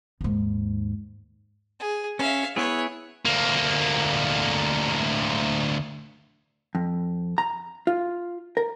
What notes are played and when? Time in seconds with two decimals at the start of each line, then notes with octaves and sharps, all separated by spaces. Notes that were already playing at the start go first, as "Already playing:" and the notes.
0.21 D#2 G#2
1.80 G#4
2.19 C#4 E5 F5
2.56 B3 E4 G#4 C#5
3.26 D2 A#3
6.75 F2
7.38 A#5
7.87 F4
8.57 A#4